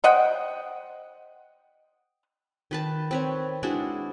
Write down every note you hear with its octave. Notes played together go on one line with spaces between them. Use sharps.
C5 D#5 F#5 G5
D#3 B4 A5
C4 B4 C#5
G#3 D4 E4 F#4